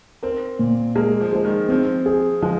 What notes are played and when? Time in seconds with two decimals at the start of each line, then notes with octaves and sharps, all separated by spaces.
0.23 C4 A#4
0.59 A#2
0.96 G#3 A#3
1.21 F3
1.32 F3 G#3
1.45 D#3
1.69 F3 C4
2.06 G#4
2.42 F3 G#3